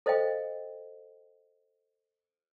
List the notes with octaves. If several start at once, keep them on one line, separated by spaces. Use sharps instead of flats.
A4 C5 D#5 F5 G5